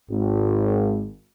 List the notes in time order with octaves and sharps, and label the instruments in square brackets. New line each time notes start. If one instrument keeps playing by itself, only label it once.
[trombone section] G#1